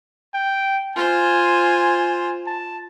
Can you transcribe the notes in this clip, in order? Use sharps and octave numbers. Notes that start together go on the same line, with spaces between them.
G5
F4 C5 G#5
A5